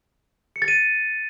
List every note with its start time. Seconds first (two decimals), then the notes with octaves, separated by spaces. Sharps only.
0.56 C#7
0.62 A6
0.68 D#7